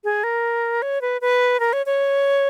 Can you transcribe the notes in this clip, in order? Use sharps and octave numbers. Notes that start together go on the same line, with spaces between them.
G#4
A#4
C#5
B4
B4
A#4
C#5
C#5